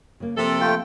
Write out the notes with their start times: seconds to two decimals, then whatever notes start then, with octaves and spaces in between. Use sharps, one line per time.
0.20 C#3 A#3
0.37 C3 F3 A#3 C4 A4
0.61 A3 F4 G5